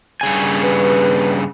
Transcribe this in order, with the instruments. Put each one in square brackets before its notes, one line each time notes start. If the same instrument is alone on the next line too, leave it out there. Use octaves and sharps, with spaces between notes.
[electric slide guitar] G2 C#3 G#5
[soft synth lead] B4